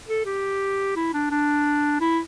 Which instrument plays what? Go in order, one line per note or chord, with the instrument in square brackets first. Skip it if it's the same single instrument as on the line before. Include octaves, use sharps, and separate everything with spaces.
[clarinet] A4
G4
E4
D4
D4
E4